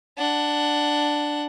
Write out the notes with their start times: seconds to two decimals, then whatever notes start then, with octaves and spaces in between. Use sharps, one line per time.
0.17 D4 F#5